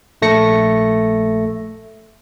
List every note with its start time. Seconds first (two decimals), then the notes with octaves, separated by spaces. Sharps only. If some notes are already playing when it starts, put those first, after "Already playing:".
0.22 A#1 A3 A#6 C#7